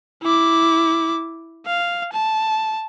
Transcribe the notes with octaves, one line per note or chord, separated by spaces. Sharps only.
E4 D6
F5
A5